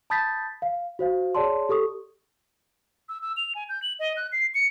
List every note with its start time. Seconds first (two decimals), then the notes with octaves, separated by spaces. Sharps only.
0.10 A5 B5 D#6 G6 A6 B6
0.62 F5
0.99 F#4 C5 F5
1.35 G#4 C#5 D5 A5 C6
1.69 G4 A4 C#6 D#6
3.09 E6
3.22 E6
3.37 F7
3.55 G#5
3.69 G6
3.83 F#7
3.99 D#5
4.17 F#6
4.32 C7
4.54 C#7